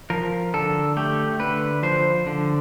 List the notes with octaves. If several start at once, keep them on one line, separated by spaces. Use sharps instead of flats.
F3 A#4
D3 A4
A3 G4
D3 B4
F3 C5
D3